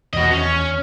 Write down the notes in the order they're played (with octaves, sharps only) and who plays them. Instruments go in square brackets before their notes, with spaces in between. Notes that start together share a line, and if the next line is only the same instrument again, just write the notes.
[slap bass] E2 D#3 [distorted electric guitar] F#4 D#5
[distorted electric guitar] C#4